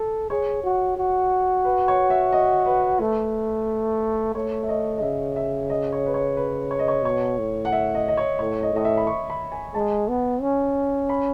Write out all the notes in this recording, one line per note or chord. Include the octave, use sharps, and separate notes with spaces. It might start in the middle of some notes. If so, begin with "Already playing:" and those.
Already playing: A4
G#4 C#5
F#4
F#4
B4
C#5
E5
D#5
B4
A3
A3 C#5
E5
D#5
D#5
C#3 E5
E5
D#5
C#5
B4
C#5
B4
C#5
D#5
C#5
B2 C#5
A2
F#5
E5
D#5
D#5
C#5
A2 C#5
D#5
A2 D#5
E5
B5
C#6
B5
G#5
G#3 A5
B3
C#4
B5